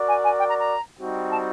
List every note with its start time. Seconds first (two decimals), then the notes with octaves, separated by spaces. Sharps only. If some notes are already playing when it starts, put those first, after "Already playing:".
Already playing: F#4 A#4 D5
0.08 G#5
0.24 G#5
0.39 G5
0.49 A#5
0.59 A#5
1.00 G3 C4 D#4 F#4
1.31 A5